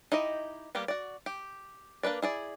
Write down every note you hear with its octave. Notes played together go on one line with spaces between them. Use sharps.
D#4 E4 G4 D#5
G3 A#3 B3 G4
F#4 D5
G4
A#3 D4 B4 D5
E4 G#4 D5